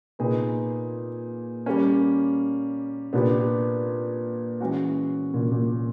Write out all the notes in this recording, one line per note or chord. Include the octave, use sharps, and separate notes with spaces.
A#2 B3 D#4 G#4 B4
G3 A#3 C#4
A#2 B3 D4 G4
E3 G#3 C#4 F#4
A#2
A#2